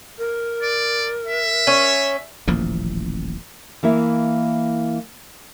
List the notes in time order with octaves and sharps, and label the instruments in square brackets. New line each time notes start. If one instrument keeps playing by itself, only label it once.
[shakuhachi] A#4
[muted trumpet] D5
E5
[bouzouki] C#4
[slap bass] D#1 A1 F3 A#3
[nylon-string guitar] E3 A#3 E4 E5